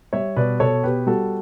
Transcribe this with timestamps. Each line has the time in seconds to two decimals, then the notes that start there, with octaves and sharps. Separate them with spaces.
0.13 G3 C#5 E5
0.36 B2 B4 D5
0.60 B2 A4 C#5
0.84 B3 G4 B4
1.07 G3 F#4 A4